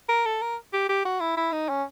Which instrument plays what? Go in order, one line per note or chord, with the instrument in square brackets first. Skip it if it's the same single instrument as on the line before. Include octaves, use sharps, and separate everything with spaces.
[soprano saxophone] A#4
A4
A#4
G4
G4
F#4
E4
E4
D#4
C#4